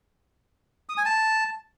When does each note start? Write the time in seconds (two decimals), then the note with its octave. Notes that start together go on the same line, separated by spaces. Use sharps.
0.89 D#6
0.97 G#5
1.05 A5